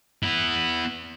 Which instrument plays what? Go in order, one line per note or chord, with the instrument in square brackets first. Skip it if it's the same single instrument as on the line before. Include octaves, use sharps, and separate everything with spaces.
[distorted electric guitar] B3 E4